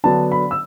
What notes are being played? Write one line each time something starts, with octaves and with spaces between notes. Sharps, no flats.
D3 F#3 B3 D4 A5
B5
E6